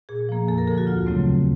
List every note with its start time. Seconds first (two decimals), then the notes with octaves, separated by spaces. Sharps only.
0.09 A#2 G#4
0.29 F3 A#3
0.48 F2 A4
0.58 A#4
0.67 D3 F3 A4
0.78 F#4
0.87 D2 F4
1.06 C#3 F#3 A3 C4
1.26 D#2